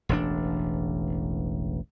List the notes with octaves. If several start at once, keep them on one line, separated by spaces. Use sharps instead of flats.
E1 A1 D4